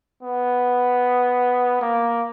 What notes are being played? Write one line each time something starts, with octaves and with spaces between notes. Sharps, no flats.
B3
A#3